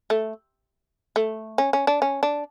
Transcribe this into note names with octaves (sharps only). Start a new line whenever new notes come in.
A3
A3
C#4
C#4
D4
C#4
D4